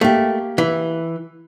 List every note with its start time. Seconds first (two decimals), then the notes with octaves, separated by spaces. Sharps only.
0.01 A3 A#3 G4
0.58 E3